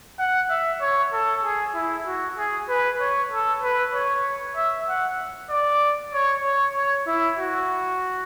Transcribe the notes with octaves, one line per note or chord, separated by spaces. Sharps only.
F#5
E5
C#5
A4
G#4
E4
F#4
G#4
B4
C#5
A4
B4
C#5
E5
F#5
D5
C#5
C#5
C#5
E4
F#4